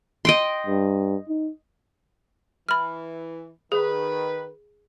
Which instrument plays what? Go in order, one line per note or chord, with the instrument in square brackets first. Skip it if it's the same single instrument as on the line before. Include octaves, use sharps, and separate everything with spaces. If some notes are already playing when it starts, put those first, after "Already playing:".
[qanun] D#5 G5 C6
[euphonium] G2
D#4
[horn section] E3 [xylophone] B5 F6
[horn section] D#3 B4 [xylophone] G#4